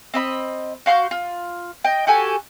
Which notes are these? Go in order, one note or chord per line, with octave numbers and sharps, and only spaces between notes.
C4 D#5 B5
F#4 F5 C6 G6
F4
D#5 G5
F#4 G4 A4 G#5